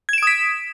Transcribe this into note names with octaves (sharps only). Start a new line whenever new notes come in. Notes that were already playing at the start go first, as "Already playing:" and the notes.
D#6 G#6 B6 D7 E7